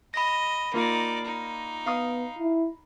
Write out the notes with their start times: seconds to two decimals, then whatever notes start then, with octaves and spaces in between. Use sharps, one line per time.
0.14 D#5 B5 A#6
0.74 A#3 D#4 F4 D5
1.25 D#4
1.86 B3 F5 D#6
2.39 E4